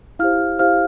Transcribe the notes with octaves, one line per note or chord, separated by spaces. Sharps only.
E4 G4 C5 F5 F6
E4 G4 C5 F5 F6